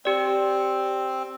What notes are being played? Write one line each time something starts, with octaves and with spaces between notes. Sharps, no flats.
C4 G4 D5